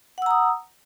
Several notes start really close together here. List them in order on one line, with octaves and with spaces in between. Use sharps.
F#5 E6 A#5 D#6